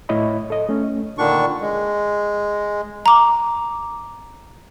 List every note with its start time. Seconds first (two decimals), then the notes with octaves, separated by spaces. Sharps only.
0.09 A2 A3 E4 C#5 D#5 B5
0.50 A4 D#5
0.69 A3 C#4
1.18 A#2 D3 D#3 D4 C#6
1.61 G#3
3.06 A#5 D6